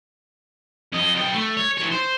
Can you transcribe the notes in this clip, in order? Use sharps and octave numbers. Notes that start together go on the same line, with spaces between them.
F2 D#5
B1 G5
A3
C#5
E3 C#5
C5